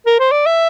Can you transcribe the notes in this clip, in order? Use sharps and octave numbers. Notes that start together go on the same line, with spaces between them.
A#4
C5
D5
E5